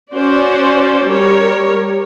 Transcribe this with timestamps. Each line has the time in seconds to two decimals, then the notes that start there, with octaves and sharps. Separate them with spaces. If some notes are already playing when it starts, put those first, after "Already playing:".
0.12 C#4 F#4 C5 D5
1.08 G3 A#4 C#5